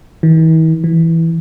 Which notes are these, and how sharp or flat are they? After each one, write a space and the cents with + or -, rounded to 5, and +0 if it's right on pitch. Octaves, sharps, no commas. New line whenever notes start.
E3 -45
E3 -5